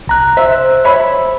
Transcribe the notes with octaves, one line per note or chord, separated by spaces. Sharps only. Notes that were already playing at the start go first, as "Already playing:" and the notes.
C2 A#5 F#6
C5 E5
C#5 E5 B5